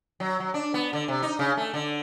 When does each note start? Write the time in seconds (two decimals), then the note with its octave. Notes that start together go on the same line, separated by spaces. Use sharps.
0.20 F#3
0.40 F#3
0.54 D4
0.74 B3
0.93 D3
1.08 C3
1.22 D#4
1.39 C#3
1.57 A3
1.74 D3